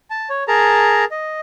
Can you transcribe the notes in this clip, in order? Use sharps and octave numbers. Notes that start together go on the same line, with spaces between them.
A5
C#5
G#4 A#4 A5 A#5
D#5